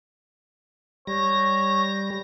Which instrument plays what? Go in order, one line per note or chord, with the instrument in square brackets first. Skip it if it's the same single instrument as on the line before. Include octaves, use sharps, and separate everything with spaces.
[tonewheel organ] G3 A#6 [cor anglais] C#5